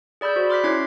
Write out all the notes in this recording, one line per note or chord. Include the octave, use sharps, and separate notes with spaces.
G#4 D5 B5 E6 G6
F#4 C5
C6 D6 F6 F#6 B6
C#4 E4 C#5 D6 G#6 C7